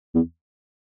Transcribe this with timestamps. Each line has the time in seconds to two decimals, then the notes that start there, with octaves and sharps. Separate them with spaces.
0.15 E2